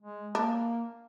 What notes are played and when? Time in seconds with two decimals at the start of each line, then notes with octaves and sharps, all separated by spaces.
0.01 G#3
0.35 A#3 D4